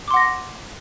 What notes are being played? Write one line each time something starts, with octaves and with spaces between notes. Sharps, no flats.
F#5 C6 D6 A#6